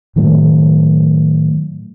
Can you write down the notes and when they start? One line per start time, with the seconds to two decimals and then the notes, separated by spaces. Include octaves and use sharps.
0.16 A2 D#3 F#3 A3